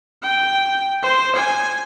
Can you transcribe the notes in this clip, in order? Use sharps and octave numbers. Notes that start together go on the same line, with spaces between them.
G5
C5
G#5